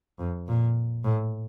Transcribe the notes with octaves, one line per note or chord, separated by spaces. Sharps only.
F2
A#2
A2